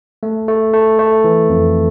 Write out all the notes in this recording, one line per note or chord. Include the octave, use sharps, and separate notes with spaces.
A3
A3
A3
A3
E3
F2